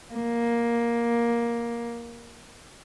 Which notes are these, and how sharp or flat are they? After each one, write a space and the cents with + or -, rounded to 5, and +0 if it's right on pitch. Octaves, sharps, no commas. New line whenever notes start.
A#3 +10